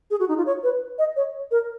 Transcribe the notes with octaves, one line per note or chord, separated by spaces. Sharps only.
G#4
F#4
D#4
F4
C#5
B4
D#5
C#5
A#4